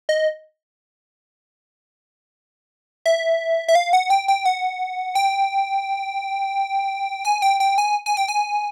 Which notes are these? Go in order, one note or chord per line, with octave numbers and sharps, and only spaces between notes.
D#5
E5
E5
F5
F#5
G5
G5
F#5
G5
G#5
G5
G5
G#5
G#5
G5
G#5